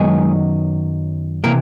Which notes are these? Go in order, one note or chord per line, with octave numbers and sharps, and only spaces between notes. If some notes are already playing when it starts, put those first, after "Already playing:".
Already playing: F#2 D#3 F#3 G#3 B3 D#4 G#4
C3 E3 A#3 A#4